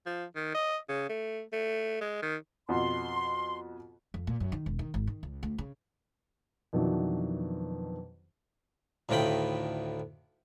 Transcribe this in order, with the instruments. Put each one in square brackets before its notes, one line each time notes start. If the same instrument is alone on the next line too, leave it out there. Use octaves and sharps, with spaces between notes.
[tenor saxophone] F3
D#3
D#5
C#3
A3
A3
G#3
D#3
[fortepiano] F2 B2 [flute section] C6
[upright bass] F2
A#2
F#2
D#3
E1
D#3
G#1
D#3
C#2
D2
C#3
[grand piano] F2 B2 D#3 E3 F#3 D4
[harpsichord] D2 A2 D#3 F4 G5 B5